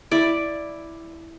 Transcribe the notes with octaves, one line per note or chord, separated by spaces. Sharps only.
E4 D5